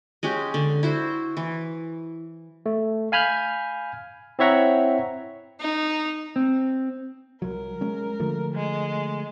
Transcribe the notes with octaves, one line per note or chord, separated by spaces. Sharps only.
G#3 C#4 F#4 G4
D3
E4 F#4 C5
E3
A3
F5 G#5 B5 F6 G6
C4 E4 C#5 E5 F#5 A#5
D#4
C4
C2 F#3 A#4
G#3 C#4
D3 F3 A3
G#3